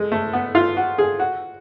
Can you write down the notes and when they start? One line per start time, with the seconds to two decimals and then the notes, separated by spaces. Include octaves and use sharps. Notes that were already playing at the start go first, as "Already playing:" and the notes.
Already playing: G#3
0.12 A3
0.33 B3
0.55 F4
0.77 F#4
0.98 G#4
1.20 F#4